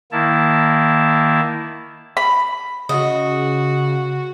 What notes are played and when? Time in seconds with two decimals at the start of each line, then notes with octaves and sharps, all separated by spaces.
0.12 D#3 A#3 E4 A5
2.17 B5
2.89 C#3 F#4 D#5